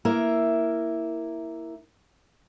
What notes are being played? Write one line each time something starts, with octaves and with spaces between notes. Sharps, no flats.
A#3 E4 A#4